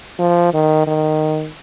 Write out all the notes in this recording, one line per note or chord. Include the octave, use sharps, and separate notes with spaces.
F3
D#3
D#3